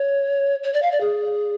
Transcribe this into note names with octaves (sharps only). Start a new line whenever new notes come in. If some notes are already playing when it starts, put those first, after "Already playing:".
Already playing: C#5
C#5
D5
F5
D5
G#4